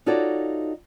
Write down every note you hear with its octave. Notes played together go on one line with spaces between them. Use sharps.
D#4 F4 F#4 A4 C#5 D5